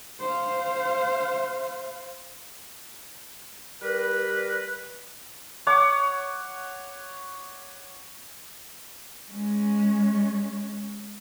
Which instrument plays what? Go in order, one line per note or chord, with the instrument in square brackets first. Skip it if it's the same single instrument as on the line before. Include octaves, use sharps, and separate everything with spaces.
[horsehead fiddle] C5 F5
[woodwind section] G3 A#4 B4
[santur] C#5 F#5 D6
[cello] G#3 C#4